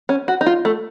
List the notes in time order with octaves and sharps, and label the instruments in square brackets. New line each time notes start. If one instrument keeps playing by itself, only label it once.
[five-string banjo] C#4
F#4
D#4
F4
A3